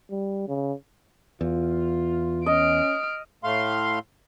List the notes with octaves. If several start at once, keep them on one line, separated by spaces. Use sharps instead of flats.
G3
C#3
E2 F4
C#4 D#5 F6 D7
A2 A3 F5 C6